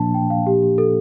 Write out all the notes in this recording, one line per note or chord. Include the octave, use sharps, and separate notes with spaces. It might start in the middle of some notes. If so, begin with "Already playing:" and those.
Already playing: A#2 F3 A#3 D4 A5
G5
F5
G4
G4
A4